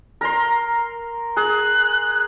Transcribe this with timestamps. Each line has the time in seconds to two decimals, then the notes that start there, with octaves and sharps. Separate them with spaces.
0.21 A#4 A#5 C6
1.37 G#4 F#6